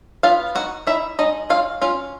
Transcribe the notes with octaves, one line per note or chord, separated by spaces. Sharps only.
B3 F4 F5
D#4 F#4 F#5
D#4 E4 E5
G#3 D#4 D#5
F#3 F4 F5
C#4 F4 F5